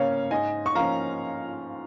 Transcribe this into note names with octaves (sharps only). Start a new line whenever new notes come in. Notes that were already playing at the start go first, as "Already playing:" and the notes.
Already playing: C#3 A#3 C#4 C#5 F5
G#2 D#5 G#5
C#6
F3 A#3 C#4 F5 A#5